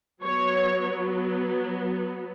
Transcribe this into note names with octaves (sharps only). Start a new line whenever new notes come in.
F#3 B3 C#5